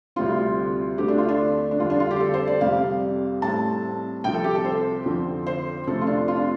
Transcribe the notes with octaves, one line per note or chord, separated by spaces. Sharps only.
D2 C3 G3 C4 F4
D2 D3 A3 C4 G4
D4
F4
D4
D4
F2 D3 G3 F4
D4
F4
G4
A4
C5
D5
F2 C3 G3 F5
A2 G3 C4 A5
C2 C3 F3 G5
A4
G4
A4
C5
F2 D3 F3 C4
C5
F2 C3 F3 A3 C4 A4
F4
D4
F4
D4